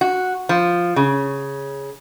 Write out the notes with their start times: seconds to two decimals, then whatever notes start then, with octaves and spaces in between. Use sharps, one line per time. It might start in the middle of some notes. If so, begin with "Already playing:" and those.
0.01 F#4
0.49 F3
0.96 C#3